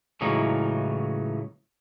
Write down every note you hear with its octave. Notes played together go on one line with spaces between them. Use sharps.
C#2 A2 C#3 E3 F#3 D#4